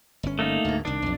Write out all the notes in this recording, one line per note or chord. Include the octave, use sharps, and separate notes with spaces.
G1 C#4
A3 A#3 D#4
D2 G#2
C2 D#3 D4
B1 F2